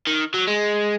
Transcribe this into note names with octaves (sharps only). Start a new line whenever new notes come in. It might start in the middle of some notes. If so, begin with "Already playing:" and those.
D#3
F#3
G#3